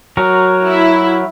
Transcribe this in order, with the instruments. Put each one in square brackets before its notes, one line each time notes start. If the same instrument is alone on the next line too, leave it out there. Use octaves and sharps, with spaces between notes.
[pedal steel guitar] F#3 F#4 A#4
[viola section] E4